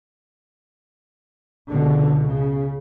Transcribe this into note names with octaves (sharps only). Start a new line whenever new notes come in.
C#2 B2 D3
C#3